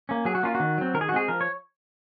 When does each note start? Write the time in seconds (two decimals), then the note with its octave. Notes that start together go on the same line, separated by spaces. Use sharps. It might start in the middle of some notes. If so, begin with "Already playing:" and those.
0.09 A#3 C#4
0.25 F#3 G#4
0.35 F#4
0.43 A#3 C#4 F4
0.55 F#4
0.60 D#3
0.78 F#3 C4
0.94 D#3 A#4
1.01 G#4
1.09 F#4
1.12 G#3 C4 G#4
1.28 F3 A#4
1.41 C#5